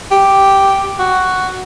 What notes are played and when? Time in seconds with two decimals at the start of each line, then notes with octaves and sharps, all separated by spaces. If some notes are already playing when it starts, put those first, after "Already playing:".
0.11 G4
0.99 F#4